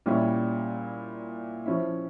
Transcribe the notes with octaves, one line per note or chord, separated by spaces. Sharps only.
A#2 G3 C#4 E4
F3 C#4 E4